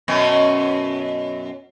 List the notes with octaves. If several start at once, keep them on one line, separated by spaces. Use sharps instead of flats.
F#2 B2 C#4